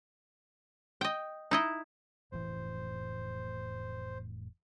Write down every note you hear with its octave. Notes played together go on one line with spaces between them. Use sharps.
D#5 G5
D#4 E4 D#5
F1 A2 E3 C5